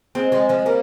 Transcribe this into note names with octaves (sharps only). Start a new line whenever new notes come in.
G#3 C4
F3 G#3
F3 G#3
G3 A#3